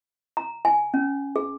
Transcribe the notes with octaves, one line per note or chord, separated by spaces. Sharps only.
A#5
G#5
C#4
G#4